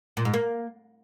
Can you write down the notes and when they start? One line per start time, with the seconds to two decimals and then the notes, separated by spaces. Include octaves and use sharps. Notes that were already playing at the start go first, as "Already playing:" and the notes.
0.17 A#2
0.25 G#2
0.34 A#3